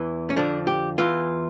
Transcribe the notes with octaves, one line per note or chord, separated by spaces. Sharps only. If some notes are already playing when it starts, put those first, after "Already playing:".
Already playing: E2 E3
C#4
F2 D3 F3 D4
G4
E2 E3 F4